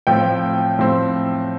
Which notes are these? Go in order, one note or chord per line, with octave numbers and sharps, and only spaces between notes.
A2 F3 C4 G5
A2 F3 C4